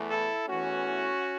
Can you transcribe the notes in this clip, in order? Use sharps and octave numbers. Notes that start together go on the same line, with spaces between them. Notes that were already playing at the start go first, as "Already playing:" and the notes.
Already playing: E2 E3 A3
E4 A4
E2 E3 A3 C#4 F#4